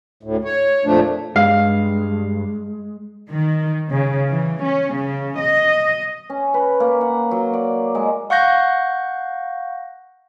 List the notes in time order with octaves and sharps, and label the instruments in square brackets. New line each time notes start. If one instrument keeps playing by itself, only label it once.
[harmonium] D2 A2
C#5
F2 A#2 F3 A3 D4
[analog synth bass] G2 [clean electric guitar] G#3 [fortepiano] F5
[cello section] D#3
C#3
E3
C#4
C#3
D#5
[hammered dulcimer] C#4
B4
A#3
F#5
F#3
D5
G#3
[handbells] F5 F#5 C#6 F#6 G6 A#6